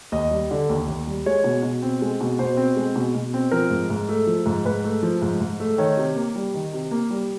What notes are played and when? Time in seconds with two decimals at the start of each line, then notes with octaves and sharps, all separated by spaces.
0.12 D#2 D#5
0.31 G3
0.51 D3
0.69 D#2
0.88 D#2
1.07 G3
1.26 G#3 C#5
1.44 B2
1.63 B2
1.82 C4
2.02 G#3
2.21 B2
2.39 B2 C5
2.57 C4
2.77 G#3
2.96 B2
3.15 B2
3.34 C4
3.51 F3 A#4
3.71 G#2
3.90 G#2
4.09 A3
4.27 F3
4.46 G#2
4.65 G#2 B4
4.84 A3
5.03 F3
5.22 G#2
5.40 G#2
5.60 A3
5.78 D#3 C#5
5.97 C3
6.16 A#3
6.36 G3
6.54 D#3
6.73 C3
6.91 A#3
7.10 G3